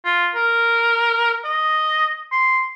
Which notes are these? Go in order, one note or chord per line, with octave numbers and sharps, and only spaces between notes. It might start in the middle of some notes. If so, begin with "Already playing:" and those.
F4
A#4
D#5
C6